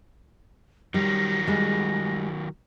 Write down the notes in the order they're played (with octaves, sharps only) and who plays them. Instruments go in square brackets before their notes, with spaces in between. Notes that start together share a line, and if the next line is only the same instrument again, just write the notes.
[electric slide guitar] D#3 F#3 [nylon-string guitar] G3 [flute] A#6
[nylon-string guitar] G3 G#3